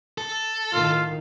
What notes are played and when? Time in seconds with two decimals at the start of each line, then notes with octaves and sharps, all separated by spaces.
0.18 A4
0.73 A2 D#3 F4